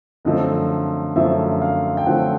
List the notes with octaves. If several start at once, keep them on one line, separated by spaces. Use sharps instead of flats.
F#2 D3 F3 A3 C4 D#5
F#2 D3 F3 A3 C4 E5
F5
G5
F#2 D3 F3 A3 C4 F#5